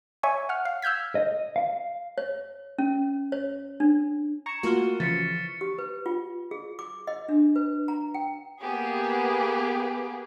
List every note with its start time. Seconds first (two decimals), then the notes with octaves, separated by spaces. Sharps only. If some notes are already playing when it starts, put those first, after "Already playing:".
0.23 C#5 E5 G#5 C#6
0.49 F#5 F6
0.65 F5
0.82 E6 F6 G6 G#6 B6
1.15 D#5
1.56 F5
2.18 C#5
2.78 C#4
3.32 C#5
3.80 D4
4.46 A#5 C#6 G#6 C#7 E7
4.63 A3 A#3 F4 F#4 C#6 F6
5.00 C#3 E3 F3 A6 B6 C#7
5.61 G4
5.78 B4
6.06 F4
6.51 G#4
6.79 D6
7.07 D#5
7.29 D4
7.56 B4
7.88 A#5
8.14 G5
8.62 A#3 B3 G4 G#4